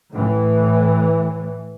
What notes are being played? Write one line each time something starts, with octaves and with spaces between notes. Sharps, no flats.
A2 E3